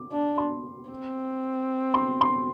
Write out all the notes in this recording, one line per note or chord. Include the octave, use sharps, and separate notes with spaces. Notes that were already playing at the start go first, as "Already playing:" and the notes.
Already playing: D6
D4
C6
C4
C6
C6